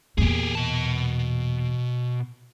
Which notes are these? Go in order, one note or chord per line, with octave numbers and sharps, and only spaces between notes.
E2 A#2 G4 G#4
B2 A5